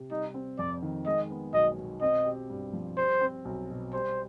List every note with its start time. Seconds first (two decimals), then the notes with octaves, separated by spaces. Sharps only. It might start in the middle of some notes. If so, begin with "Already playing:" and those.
Already playing: C3
0.11 G3 D#4
0.34 C4
0.59 F2 D5
0.82 D#3
1.06 G#3 D#5
1.30 B3
1.53 B1 D#5
1.78 B2
2.01 C4 D#5
2.26 G4
2.50 G2
2.73 F3
2.97 G3 C5
3.21 C4
3.45 B1
3.70 B2
3.93 G3 C5